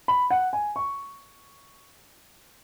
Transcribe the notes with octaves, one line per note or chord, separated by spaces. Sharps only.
B5
F#5
G#5
C#6